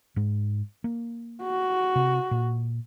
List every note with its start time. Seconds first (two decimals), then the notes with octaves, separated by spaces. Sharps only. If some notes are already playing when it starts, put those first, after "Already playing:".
0.16 G#2 G#3
0.84 A#3
1.43 F#4
1.96 C3
2.31 A#2